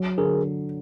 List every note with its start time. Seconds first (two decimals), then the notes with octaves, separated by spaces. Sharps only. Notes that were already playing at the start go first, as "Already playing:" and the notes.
Already playing: F#3
0.18 D3 G#4 A#4